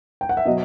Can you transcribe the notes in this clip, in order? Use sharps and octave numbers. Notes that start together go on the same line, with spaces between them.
G5
F#5
E5
B2 F#3 D#5